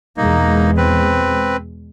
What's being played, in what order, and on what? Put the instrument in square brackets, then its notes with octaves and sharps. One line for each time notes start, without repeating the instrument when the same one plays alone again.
[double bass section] E2 B2 G#3 [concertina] A#3 D#4
[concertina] C4 B4